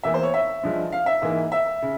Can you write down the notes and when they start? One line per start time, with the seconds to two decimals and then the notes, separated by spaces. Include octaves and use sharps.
0.03 E2 E3 A#3 E5
0.14 C5
0.23 C#5
0.34 E5
0.63 G2 F3 G#3
0.92 F5
1.06 E5
1.22 G#2 E3 A#3
1.52 E5
1.82 C#3